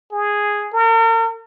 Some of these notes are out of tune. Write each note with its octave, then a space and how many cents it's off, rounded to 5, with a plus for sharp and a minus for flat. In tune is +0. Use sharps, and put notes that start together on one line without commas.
G#4 -5
A#4 -45